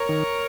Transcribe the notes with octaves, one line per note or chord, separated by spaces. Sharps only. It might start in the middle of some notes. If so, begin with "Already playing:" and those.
Already playing: A#4 C#5
D#3